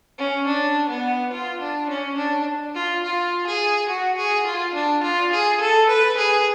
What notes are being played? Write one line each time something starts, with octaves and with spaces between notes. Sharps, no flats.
C#4
D4
B3
F4
D4
C#4
D4
F4
F4
G#4
F#4
G#4
F4
D4
F4
G#4
A4
B4
G#4